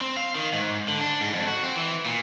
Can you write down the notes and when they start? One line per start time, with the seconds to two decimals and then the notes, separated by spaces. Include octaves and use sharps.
0.01 C4
0.17 F5
0.35 D#3
0.53 G#2
0.88 D3
1.01 D4
1.21 G#2
1.33 F2
1.47 F#4
1.63 C4
1.76 E3
2.05 A#2